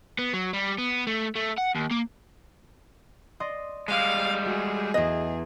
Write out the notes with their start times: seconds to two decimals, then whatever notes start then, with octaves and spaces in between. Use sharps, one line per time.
0.19 B3
0.34 F#3
0.54 G3
0.78 B3
1.07 A3
1.36 A3
1.58 F#5
1.75 D#2
1.91 A#3
3.40 D5 D#5 C6
3.88 G3 G#3 F5
4.45 A3 F#4 G#4 F#5
4.94 E2 B3 D#5